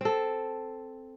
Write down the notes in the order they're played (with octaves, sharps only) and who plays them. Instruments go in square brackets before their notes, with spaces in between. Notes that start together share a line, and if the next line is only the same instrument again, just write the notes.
[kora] C4 A4